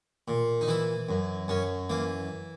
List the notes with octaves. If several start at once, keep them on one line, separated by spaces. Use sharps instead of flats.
A#2
D#4
E3 E4
F#2
F#2 C#4
E3 A#3